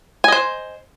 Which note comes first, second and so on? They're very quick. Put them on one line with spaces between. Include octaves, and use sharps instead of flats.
G#5 D#5 C5